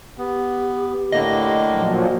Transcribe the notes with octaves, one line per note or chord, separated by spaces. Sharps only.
B3 G4
A2 D3 A#3 D#5
A#2 F3 F#3